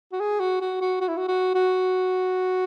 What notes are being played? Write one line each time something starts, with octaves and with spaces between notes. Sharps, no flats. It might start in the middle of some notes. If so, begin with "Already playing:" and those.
F#4
G#4
F#4
F#4
F#4
F#4
E4
F#4
F#4
F#4